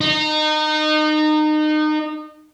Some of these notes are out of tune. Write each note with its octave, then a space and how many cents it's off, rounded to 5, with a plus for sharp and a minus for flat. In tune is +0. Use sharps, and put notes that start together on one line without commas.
D#4 -25